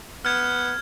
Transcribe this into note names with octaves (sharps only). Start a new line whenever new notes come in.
B3 F6 G#6